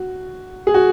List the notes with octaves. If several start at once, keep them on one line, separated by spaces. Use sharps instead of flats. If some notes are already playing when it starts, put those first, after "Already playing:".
Already playing: F#4
G#4
F#4